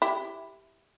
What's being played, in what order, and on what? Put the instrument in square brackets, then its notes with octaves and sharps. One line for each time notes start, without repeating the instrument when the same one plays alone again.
[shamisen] E4 G4